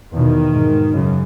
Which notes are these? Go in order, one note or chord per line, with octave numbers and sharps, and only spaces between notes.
E2 B2 D#3
G#2
F#2 C#3